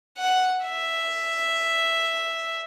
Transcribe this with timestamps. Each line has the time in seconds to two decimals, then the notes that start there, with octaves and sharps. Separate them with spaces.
0.18 F#5
0.64 E5